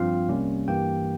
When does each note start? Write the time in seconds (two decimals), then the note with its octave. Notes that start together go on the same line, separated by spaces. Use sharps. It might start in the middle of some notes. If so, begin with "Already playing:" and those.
Already playing: G2 F3 C4 F4 F5
0.29 C2 C3 G3 A#3 C#4
0.68 G2 E3 A#3 G4 G5